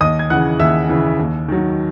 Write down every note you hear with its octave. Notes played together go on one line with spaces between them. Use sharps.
D#2 D#5 D#6
G#6
C#3 E3 F#5 F#6
D#2 E5 E6
C#3 E3
D#2
D#3 F#3